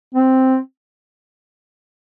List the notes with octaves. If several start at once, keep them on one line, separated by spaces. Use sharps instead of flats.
C4